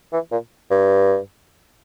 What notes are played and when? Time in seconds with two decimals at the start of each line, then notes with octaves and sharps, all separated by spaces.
0.13 E3
0.32 A#2
0.71 G2